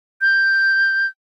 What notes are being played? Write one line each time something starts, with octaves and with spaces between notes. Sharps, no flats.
G6